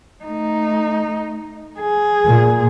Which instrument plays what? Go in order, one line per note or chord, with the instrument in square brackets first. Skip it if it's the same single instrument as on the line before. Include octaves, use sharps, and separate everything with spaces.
[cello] A3 D#4
G#4
[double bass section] A#2